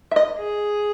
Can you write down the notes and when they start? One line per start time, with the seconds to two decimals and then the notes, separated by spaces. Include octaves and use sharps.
0.11 E5
0.16 D#5
0.39 G#4